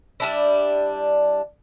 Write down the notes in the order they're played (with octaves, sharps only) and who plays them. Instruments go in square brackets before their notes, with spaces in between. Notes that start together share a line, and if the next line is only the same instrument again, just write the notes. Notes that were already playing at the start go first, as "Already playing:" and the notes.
[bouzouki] G3 D4 E4